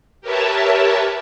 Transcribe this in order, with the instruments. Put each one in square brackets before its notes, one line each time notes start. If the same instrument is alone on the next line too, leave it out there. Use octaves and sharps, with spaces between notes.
[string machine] G4 A#4 B4 C#5 E5 A5